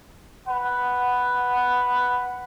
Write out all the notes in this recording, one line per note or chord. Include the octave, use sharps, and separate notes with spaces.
B4 F#5